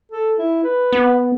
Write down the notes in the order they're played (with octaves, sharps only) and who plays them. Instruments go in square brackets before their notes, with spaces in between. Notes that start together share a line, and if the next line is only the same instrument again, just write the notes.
[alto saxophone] A4
E4
B4
[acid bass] B3